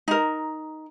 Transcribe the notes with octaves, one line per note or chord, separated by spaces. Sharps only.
D#4 A#4